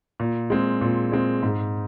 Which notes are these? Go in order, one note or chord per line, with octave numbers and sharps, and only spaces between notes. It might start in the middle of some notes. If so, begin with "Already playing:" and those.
A#2
G#3 C4
A#2
G#3 C4
G#2